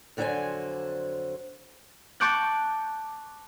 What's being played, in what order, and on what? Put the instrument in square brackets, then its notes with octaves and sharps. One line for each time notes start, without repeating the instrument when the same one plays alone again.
[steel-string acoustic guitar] F2 D3 F#3 F4 C5 G#5
[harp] A5 C#6 D6 F#6 G6